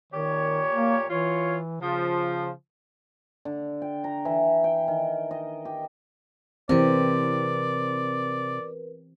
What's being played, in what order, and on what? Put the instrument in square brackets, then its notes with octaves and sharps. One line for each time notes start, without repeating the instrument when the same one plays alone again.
[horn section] A#2 G4 C#5 [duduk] D#3
[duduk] A#3
[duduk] E3 [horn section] F4 C#5
[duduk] C#3 [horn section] F3
[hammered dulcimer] D3
G5
A#5
E3
G5
D#3
D#5
G4
[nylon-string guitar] C3 [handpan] E3 C4 [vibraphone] A#4 B4 [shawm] D5